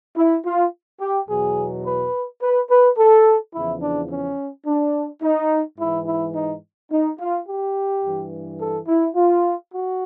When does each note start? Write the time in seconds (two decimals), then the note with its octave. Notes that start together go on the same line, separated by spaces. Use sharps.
0.17 E4
0.45 F4
1.01 G4
1.29 E2 B2 F#3 G#4
1.85 B4
2.42 B4
2.70 B4
2.98 A4
3.54 E2 C#3 F3 E4
3.82 D4
4.10 C#4
4.66 D4
5.23 D#4
5.78 G#2 E3 E4
6.07 E4
6.35 D#4
6.91 D#4
7.19 F4
7.47 G4
8.04 G2 E3
8.59 A4
8.87 E4
9.16 F4
9.72 F#4